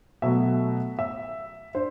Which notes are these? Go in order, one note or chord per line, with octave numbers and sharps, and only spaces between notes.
B2 F#3 A3 E5
E5
D4 C5